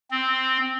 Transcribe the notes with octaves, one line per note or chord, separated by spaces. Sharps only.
C4